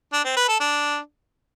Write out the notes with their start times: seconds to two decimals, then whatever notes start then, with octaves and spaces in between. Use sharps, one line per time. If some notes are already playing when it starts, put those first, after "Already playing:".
0.13 D4
0.25 C4
0.37 B4
0.49 A4
0.60 D4